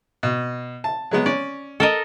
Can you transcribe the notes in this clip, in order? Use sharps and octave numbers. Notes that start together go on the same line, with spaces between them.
B2
A5
F#3 G#3 B3
C#4 D5
A4 A#4 D#5